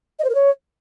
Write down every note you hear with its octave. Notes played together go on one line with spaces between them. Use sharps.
D#5
C5
A#4
C#5